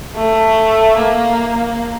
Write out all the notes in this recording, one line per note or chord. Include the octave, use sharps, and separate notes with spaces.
A3
A#3